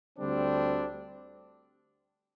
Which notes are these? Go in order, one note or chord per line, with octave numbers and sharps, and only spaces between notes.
D2 D3 G3 C4 D4